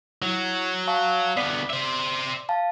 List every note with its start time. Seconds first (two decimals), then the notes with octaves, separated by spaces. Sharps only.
0.22 F#3 E4
0.87 F5 A5 C#6
1.37 D2 B3 D5 B6 C7
1.70 C5 E5
2.49 F5 A5